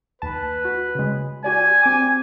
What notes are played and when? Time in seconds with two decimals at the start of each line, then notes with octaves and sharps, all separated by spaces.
0.22 D#2 B4 A5
0.65 F#4
0.95 C#3 G#3
1.44 F#4 G4 D5 G#5
1.83 C4 G#5 D6